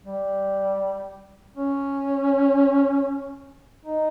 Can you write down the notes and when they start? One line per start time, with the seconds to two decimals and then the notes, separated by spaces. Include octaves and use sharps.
0.04 G3
1.57 C#4
3.86 D#4